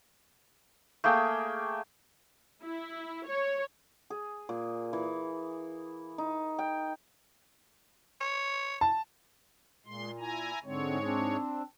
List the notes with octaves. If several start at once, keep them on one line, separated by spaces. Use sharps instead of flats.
A3 A#3 G#4 G5
E4
C#5
G#4
A#2
E3
D#4
G5
C#5
A5
A#2 G#3 C6
E4 G#5 A#5
G#2 D3 G#3 C4 C#5
C4 D4